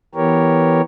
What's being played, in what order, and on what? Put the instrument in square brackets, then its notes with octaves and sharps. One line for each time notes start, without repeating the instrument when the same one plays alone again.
[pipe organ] E3 B3 G4 A#4 C#5